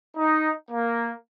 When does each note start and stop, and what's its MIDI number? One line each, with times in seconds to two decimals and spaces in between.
0.16 0.49 63
0.70 1.11 58